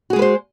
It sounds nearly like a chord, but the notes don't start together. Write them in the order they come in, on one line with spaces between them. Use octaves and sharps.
F#4 G#4 G#3 B4 C5